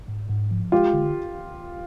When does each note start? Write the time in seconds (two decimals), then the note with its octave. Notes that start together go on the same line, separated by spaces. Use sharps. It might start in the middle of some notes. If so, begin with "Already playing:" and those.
0.08 G#2
0.29 G#2
0.51 F3
0.72 G#3 F4 G4
0.94 D3